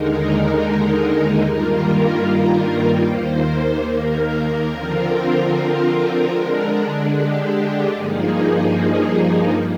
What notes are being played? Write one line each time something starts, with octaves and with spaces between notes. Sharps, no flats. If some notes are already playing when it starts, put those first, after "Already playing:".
Already playing: D#2 D3 G#3 D#4 A#4
G2 D#3 G3 A#3 F4 A#4
D#2 D#3 A#3 C5
A#4
D3 F3 C4 F4
D3 G#3 D4
G4
G2 F3 A#3 D#4 G#4